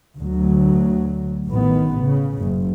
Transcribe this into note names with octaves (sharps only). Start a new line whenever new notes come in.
D2 F#3
A1 D#3 B3
C#3
F#1